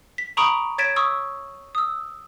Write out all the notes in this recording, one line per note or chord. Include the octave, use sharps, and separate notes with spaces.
B6
A#5 B5 C#6 D#6 D7
C#5 G#6 A6 B6 D7 E7
C#6 D#6 E6
D#6 E6